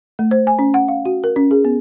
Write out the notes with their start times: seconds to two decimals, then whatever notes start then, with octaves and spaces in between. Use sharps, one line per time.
0.19 A3
0.31 C5
0.47 G#5
0.59 C#4
0.74 F#5
0.88 F5
1.05 F#4
1.24 A#4
1.36 C#4
1.51 G#4
1.65 B3